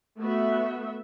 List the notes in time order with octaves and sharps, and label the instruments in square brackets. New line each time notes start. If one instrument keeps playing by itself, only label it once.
[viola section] A3 B3 F#4 E5